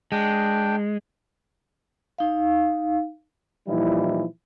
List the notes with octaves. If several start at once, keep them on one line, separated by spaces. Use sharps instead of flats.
G#3 D4 G5
D#4 F5
A#2 E3 F3 G3 D#4 E4